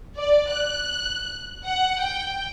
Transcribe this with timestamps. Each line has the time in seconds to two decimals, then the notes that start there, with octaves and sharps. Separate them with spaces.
0.18 D5
0.52 F#6
1.65 F#5
2.01 G5